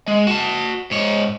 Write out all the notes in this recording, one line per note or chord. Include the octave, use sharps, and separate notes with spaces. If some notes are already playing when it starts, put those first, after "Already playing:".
G#3
F#4 A5
G#2 C#5